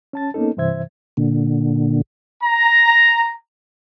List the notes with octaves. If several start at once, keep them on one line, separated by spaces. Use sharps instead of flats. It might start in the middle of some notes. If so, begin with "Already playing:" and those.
C#4 A5 A6
A#3 B3 C#4 D#4 A4
G2 C3 E3 C5 E5 G#6
A#2 D3
A#5